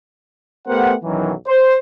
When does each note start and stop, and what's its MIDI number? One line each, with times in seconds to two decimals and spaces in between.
0.67 0.93 57
0.67 0.93 59
0.67 0.93 67
0.67 0.93 70
0.67 0.93 72
0.67 0.93 78
1.04 1.32 35
1.04 1.32 42
1.04 1.32 51
1.04 1.32 52
1.04 1.32 54
1.46 1.75 72